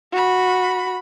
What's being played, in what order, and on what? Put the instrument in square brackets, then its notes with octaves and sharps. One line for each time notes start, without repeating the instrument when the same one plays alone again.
[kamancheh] F#4 B5